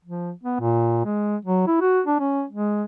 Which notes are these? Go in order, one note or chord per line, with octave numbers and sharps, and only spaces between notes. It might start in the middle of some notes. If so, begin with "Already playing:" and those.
F3
B3
A#2
G#3
F#3
E4
F#4
D4
C#4
G#3